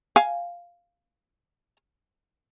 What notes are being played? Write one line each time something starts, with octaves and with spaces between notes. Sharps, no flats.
F5 G#5